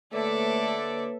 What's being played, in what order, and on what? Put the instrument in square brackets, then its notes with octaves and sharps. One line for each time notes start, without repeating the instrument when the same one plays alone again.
[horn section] D3 D5 [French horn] A3 [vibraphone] A#3 B4 C#5 [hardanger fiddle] A4 E5